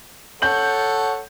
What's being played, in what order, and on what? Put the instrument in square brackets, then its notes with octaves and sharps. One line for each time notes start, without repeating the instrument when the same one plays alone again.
[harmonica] A4 C#5 F#5 [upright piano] G6 F#7